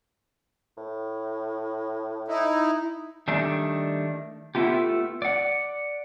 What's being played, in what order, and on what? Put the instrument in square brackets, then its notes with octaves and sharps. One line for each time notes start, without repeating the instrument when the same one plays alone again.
[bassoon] A2
[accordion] D#4 E4
[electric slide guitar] D#3 G3 A3 D4
A3 B3 E4 F4 G4
D5 F#5